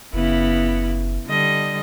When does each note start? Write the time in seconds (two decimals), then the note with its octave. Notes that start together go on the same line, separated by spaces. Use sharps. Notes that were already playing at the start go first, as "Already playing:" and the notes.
0.13 F#1 C#3 B3 E4
1.26 D3 G3 D#5